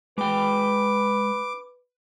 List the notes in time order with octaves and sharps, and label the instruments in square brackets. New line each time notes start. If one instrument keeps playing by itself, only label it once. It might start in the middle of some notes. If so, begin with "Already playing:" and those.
[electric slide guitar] G#3 G5 [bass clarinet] B4 [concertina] D6